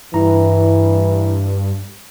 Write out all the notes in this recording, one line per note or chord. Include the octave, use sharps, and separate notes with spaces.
G2 E3 E4 A#5